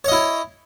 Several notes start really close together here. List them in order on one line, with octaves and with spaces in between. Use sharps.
C#5 D#5 E4